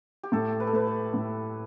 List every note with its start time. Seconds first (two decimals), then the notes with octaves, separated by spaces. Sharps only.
0.23 G4
0.32 A2 A4
0.60 B4
0.67 A4
0.73 A3 B4
0.87 B4
1.14 A2